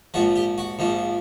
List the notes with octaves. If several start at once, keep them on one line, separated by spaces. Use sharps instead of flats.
A#1 G#2 F3 F#4
G4
F#4
A#1 G#2 F3